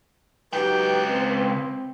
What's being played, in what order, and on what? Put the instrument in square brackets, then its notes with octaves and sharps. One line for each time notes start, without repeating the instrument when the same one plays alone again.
[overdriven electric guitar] C#2 G5 [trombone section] F#3 D#4 G4 [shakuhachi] B4
[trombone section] C4